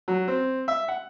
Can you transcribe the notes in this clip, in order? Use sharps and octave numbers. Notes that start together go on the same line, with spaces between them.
F#3
C4
E5
F#5